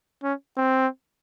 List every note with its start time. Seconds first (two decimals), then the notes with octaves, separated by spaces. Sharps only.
0.23 C#4
0.57 C4